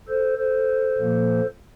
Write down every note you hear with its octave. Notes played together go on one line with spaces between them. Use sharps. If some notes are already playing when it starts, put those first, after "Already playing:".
A4 C5
A4 C5
A#2 F3 A#3